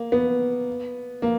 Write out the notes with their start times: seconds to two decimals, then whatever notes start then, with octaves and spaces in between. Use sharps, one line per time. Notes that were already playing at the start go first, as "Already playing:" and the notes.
Already playing: A#3
0.12 B3
1.22 A#3